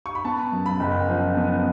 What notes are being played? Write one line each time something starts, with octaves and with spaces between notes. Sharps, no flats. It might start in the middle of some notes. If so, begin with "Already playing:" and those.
C#6
B5
B3 A5
F#2
B5
F#1
F3
B3